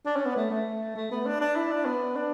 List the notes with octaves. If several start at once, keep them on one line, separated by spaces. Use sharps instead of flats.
D4
C#4
B3
A3
A3
A3
B3
D4
D4
E4
D4
B3
D4